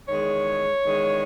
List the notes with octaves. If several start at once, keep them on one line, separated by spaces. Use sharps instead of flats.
E2 D#3 G#3 C#5
E2 D#3 G#3